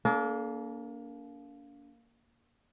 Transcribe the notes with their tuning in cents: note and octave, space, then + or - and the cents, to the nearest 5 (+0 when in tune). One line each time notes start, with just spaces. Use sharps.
A#3 +0 D4 -45 A4 -40